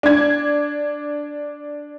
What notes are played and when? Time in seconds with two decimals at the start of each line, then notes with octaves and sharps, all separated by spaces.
0.03 D4 G#6